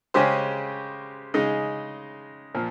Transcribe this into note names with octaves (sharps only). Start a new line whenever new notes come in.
C#3 G#3 C#4 G4 C5
C#3 G#3 D#4
A#2 F3